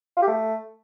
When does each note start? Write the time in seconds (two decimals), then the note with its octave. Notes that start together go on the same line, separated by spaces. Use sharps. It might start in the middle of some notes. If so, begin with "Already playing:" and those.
0.17 F4
0.22 G4
0.28 A3